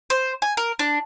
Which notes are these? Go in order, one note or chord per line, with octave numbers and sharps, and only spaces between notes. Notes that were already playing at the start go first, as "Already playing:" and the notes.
C5
G#5
A#4
D4